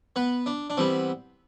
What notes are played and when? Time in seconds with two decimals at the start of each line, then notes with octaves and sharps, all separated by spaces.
0.16 B3 B4
0.46 D4
0.70 D4
0.77 E3 G3 B3 C4